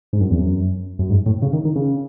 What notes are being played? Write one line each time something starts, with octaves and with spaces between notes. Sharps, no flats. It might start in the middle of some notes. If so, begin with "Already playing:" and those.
G#2
F#2
E2
F#2
F#2
G#2
A2
C#3
D#3
D#3
C#3